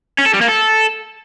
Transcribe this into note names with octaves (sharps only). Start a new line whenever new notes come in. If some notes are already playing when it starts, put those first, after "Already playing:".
C#4
A4
G3
A#3
A4